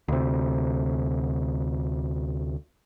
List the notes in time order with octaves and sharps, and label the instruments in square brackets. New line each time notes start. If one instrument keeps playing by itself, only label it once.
[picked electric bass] D2 C3